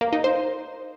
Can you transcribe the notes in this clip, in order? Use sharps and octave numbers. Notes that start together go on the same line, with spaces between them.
A#3
D#4
C5